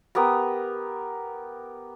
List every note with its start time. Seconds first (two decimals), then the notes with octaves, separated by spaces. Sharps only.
0.15 B3 G4 A#4 A#5